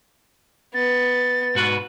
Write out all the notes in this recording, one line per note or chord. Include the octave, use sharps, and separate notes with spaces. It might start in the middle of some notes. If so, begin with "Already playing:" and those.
B3 A6
G#2 F#4 B4